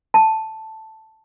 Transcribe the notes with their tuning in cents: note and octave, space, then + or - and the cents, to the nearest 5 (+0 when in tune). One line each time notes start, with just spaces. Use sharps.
A5 +0